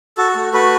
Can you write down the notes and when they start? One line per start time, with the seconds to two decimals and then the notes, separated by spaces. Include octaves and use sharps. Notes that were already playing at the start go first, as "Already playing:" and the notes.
0.17 F#4 A4
0.36 A3
0.53 F#4 B4